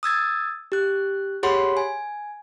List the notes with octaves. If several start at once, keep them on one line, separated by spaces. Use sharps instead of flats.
D#6 E6 G#6 A6
G4 F#6
G4 G#4 C#5 F#5 B5 C6
G#5